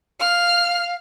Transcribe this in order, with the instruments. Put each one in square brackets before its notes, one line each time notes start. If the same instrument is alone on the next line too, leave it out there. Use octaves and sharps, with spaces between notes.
[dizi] F5 [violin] F6